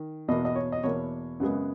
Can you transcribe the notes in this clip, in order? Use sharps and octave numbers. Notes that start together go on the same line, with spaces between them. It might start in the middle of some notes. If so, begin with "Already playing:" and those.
Already playing: D#3
E2 B2 A#3 D#5
D#5
C#5
D#5
E2 B2 A#3 C#5
F#2 C#3 G#3 B3